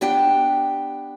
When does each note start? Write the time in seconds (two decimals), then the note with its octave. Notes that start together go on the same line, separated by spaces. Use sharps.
0.01 B3 D4 G4 G5